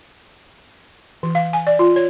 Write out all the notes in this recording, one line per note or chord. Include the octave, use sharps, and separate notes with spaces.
E3
F5
G#5
D5
F4
C#5